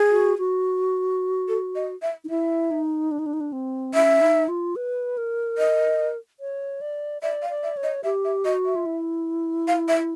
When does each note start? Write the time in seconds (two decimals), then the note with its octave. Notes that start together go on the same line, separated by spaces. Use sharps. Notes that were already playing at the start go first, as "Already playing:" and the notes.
Already playing: G#4
0.11 F#4
0.38 F#4
1.48 A4
1.75 D#5
2.02 E5
2.24 D#4
2.30 E4 E5
2.71 D#4
3.11 D4
3.19 D#4
3.26 D4
3.33 D#4
3.41 D4
3.53 C4
3.94 C#4 E5
4.21 D#4
4.48 F4
4.76 B4
5.17 A#4
5.58 D#5
6.40 C#5
6.81 D5
7.22 D5 E5
7.42 F5
7.49 D5
7.63 E5
7.77 C#5
7.83 D#5
8.04 G4 E5
8.25 E5
8.45 F#4 D#5
8.65 E5
8.76 F4
8.86 E4
9.68 F5
9.88 E5